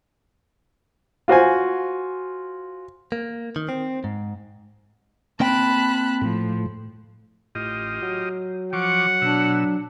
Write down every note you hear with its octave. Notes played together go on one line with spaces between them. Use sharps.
F4 F#4 C5 G#5
A#3
D#3
C4
G#2
A#3 C4 G5 A5 B5 F#6
A2 F3
A1 F4 G4 D#5
F#3
F3 F#5 C#6 D6
B2 D4 E6